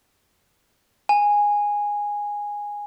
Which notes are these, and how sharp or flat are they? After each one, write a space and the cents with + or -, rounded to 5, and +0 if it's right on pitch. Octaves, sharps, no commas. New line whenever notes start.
G#5 -10